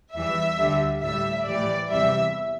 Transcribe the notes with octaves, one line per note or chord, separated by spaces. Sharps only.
E2 E3 G3 E5
D2 D3 G3
A2 G3 E5
A2 E3 G3 D5
E2 C3 E3 G3 E5